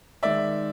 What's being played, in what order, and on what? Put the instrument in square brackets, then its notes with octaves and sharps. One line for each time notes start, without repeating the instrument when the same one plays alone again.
[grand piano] D#3 G#3 [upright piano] D5 E5